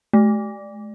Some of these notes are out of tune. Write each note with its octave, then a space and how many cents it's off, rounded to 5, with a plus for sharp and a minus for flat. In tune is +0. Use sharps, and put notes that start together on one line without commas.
A3 -45